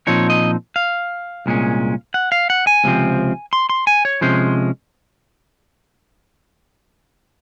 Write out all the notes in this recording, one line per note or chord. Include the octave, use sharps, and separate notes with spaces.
A#2 F3 C4 D#4 C#5
D#5
F5
C2 A#2 G#3 C#4
F#5
F5
F#5
G#5
C#2 C3 F3 C4
C6
C6
G#5
C#5
C3 F3 G#3 C#4 C5